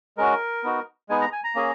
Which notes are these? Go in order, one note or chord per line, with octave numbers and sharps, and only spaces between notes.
G#3 C#4 F#4 A#4
B3 D#4 F#4
G#3 B3 D#4 G#5
A#5
G#5
A#5
A#3 C#4 G#4